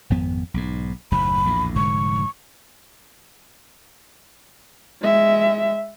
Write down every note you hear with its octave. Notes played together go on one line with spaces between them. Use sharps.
G#1 F2 B3
B1 G#2
F#1 D#2 A2 B5
A#1 E2 A2
F1 G#2 D3 C#6
G#3 E5